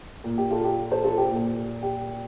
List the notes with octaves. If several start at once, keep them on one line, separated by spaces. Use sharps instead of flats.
A#2
G4
F4 A4
G4
A4 C5
F4 A4
G4
A#2
G4